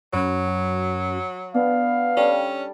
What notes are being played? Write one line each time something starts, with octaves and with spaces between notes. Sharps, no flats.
F#2 F#3 B5
G#5
B3 D4 F5
G3 C#4 D4 A4